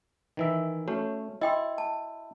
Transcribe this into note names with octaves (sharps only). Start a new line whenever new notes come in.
D#3 E3 E5
A3 C#4 F#4 C#5
E4 D#5 G5 C6
A5